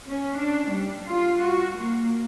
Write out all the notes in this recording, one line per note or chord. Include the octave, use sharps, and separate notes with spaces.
C#4
D4
G3
F4
F#4
A#3